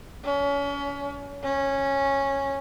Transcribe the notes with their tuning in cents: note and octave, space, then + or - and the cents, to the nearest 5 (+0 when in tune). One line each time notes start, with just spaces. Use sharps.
C#4 +30
C#4 -10